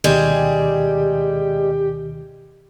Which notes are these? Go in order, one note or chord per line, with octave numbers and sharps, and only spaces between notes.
D2 B2 D#3 G3 G#3 G4 G#4